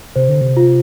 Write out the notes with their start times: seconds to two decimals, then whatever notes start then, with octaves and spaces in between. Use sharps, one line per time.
0.16 C3 C5
0.29 D3
0.41 C3
0.57 F4